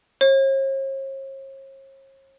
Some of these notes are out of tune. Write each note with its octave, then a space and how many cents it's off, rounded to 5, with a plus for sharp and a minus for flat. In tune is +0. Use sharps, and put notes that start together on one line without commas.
C#5 -45